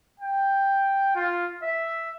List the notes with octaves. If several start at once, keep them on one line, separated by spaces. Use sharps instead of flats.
G5
F4
E5